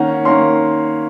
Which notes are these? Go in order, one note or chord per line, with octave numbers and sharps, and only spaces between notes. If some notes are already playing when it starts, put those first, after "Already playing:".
Already playing: D#3 A#3 C#4 F#5
D#3 A#3 C#4 C6